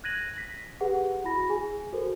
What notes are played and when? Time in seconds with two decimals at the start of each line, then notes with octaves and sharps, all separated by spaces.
0.04 F#6 G#6 A#6 D#7 F#7
0.37 A#6 B6
0.80 G4 G#4 B4 F#5
1.24 E4 F#4 B5 A#6
1.49 G#4 G#5
1.93 F#4 A4 A#4 C5